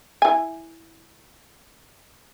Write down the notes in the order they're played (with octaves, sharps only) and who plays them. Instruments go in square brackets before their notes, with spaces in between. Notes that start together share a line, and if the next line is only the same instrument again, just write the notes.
[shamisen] E4 G#5